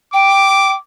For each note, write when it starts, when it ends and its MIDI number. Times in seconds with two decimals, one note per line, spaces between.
0.13 0.74 79
0.13 0.78 86